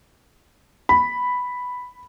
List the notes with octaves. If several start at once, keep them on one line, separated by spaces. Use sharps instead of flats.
B5